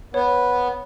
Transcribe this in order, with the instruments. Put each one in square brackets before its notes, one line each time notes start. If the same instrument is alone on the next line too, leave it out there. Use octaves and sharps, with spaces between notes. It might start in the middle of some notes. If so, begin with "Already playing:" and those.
[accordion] B3 [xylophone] C#5